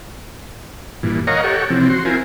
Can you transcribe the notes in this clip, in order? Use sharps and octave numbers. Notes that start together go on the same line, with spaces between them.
G2 A#2 E3
A#4 C#5 D#5 F5 F#5 A#5
G4 A4 C#5 F#5
C3 E3 F3 C4
F#4 C6
C4 E4 F4 A#4 G#5